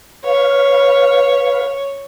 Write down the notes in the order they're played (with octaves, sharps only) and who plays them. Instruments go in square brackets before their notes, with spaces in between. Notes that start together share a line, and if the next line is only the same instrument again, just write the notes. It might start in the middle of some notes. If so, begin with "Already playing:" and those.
[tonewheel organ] B4 F5 [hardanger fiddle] C#5